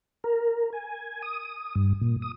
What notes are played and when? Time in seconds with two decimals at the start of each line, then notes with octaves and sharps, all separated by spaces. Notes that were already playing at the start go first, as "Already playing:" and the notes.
0.24 A#4
0.73 G#5
1.23 D#6
1.76 G2
2.01 A#2
2.22 D#6